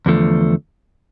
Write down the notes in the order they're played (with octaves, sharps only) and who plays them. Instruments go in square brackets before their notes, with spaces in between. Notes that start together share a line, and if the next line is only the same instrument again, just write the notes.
[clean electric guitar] E2 D3 F3 A3